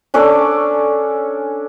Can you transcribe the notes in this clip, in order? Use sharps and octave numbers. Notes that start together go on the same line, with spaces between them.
C#4 D4 A4 D5